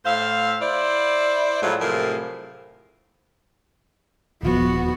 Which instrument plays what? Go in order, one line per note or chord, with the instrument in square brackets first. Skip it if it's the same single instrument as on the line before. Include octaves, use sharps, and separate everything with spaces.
[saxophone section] A2 C5 E5 F5
E4 C5 D5
A2 F3 F#3 G#3 F4 F#4
A2 C3 F3 F#3 G#4 A#4
[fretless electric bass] D#1 F3 [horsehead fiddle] B3 F#4